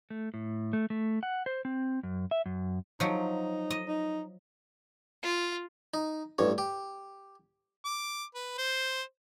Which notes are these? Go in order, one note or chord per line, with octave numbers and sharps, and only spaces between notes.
A3
A2
A3
A3
F#5
C5
C4
F#2
E5
F#2
F3 F#3 D#4
D#5
D#4
F4
D#4
A1 G2 C#5
G4
D6
B4
C5